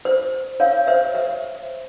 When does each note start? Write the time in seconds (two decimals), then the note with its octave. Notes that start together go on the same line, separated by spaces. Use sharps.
0.05 C5
0.60 C#5 F5
0.87 C5 E5
1.15 C5 E5